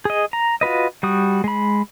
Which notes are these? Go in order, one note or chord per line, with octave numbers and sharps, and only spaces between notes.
G#4 D#5
A#5
F4 F#4 B4 D#5
G3 F#4 D#6
G#3 B5